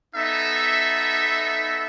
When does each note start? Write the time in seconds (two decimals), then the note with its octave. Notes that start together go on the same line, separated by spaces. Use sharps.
0.15 B3 D#4 A4 E5